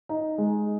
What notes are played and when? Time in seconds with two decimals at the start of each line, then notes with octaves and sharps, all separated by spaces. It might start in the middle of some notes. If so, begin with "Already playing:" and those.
0.09 D#4
0.38 G#3